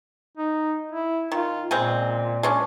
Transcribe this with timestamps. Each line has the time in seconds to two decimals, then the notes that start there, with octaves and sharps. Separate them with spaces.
0.37 D#4
0.92 E4
1.32 D#3 F4
1.71 A#2 C#3 G#3 C4
2.43 G#3 C#4 D4